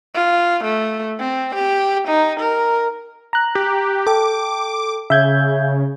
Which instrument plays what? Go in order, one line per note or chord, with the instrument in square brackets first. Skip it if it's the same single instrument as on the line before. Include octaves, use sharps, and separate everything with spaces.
[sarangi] F4
A3
C4
G4
D#4
A#4
[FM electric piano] A#5 F#6
[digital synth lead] G4
[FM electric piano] A4 G5 [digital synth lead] D6
[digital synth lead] C#3 [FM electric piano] E5 G6 G#6